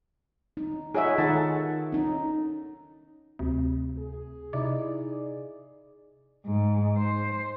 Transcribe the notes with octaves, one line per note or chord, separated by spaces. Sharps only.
D#4
F4 G#4 C#5 D#5 E5 F#5
D#3 D#4 A4 F#5 A5
C#4 D#4
D2 C3
G#4
C3 D#4 E4 D5
G#2
C5